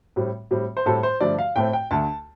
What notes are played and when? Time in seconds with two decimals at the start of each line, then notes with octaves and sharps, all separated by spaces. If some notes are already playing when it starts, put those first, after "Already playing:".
0.16 A2 G3 C4
0.51 A2 G3 C4
0.77 C5
0.86 A2 G3 C4 A4
1.03 C5
1.21 G2 D3 F3 A3 D5
1.39 F5
1.56 A2 A3 C4 G5
1.73 G5
1.91 D2 D3 A3 A5